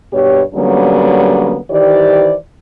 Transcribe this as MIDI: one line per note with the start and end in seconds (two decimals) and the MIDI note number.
0.13 0.42 43
0.13 0.42 47
0.13 0.42 67
0.13 0.42 73
0.55 1.57 50
0.55 1.57 54
0.55 1.57 55
0.55 1.57 58
0.55 1.57 59
0.55 1.57 61
1.71 2.33 51
1.71 2.33 52
1.71 2.33 67
1.71 2.33 72
1.71 2.33 74